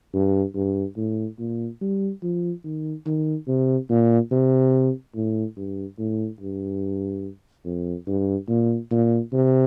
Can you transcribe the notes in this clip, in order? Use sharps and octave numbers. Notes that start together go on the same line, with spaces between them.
G2
G2
A2
A#2
G3
F3
D#3
D#3
C3
A#2
C3
A2
G2
A2
G2
F2
G2
A#2
A#2
C3